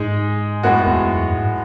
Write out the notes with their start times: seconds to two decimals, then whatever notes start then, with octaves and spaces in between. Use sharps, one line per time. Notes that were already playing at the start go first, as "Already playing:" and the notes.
Already playing: G#2 G#3 D#4 G#4
0.63 F#2 A2 G#3 B3 F#4
0.87 E2
1.10 F#2
1.32 G#2